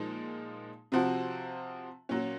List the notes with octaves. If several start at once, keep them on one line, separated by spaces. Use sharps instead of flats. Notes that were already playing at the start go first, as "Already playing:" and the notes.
Already playing: A#2 F3 G#3 D#4
C3 F3 C4 F#4
A#2 F#3 C#4